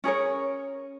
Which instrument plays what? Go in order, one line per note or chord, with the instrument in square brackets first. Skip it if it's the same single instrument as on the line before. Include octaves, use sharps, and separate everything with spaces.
[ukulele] C#4 G#4 A#4 C#5